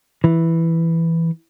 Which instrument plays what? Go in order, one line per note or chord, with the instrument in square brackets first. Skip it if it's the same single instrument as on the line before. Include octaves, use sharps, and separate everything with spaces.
[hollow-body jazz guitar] E3